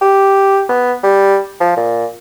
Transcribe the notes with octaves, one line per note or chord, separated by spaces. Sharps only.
G4
B3
G3
F3
A#2